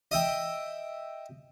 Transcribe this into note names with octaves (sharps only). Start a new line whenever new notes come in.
D#5 E5 G5